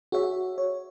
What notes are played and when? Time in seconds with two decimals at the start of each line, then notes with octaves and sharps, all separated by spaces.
0.12 F#4 G#4 C#5 E5
0.58 C#5